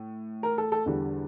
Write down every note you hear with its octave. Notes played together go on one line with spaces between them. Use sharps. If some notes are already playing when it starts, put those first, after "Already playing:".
Already playing: A2
A#4
A4
A4
E2 D3 G3